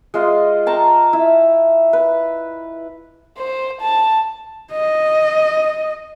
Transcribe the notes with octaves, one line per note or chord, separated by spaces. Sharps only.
G#3 F4 D#5
G5 A5 A#5 C#6
E4
B4
C5
A5
D#5